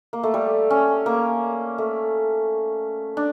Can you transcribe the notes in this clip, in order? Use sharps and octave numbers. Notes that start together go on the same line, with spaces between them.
A#3
A3
G3
C#4
A#3
A3
D4